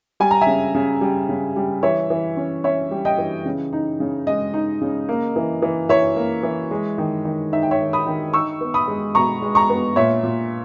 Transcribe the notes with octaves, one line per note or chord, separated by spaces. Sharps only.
G3 G#5
A#5
E5 G#5
C#3
C#3
G3
C#3
G3
E3 C#5 E5
E3
C#4
C#4 C#5 E5
G3
D#5 G5
E3
C#3
D#4
C#3
G#3 D#5
D#4
C#3
A#3
E3
E3
E3 C#5 E5
A#3
E3
G#3
D#3
D#3
D#4 E5
G5
C#5 E5
D#3
B5 D#6
D#3
D#4 C#6 E6
B3
B5 D#6
G#3
B2 A#5 C#6
G#3
A#5 C#6
B3
A#2 C#5 E5
A#2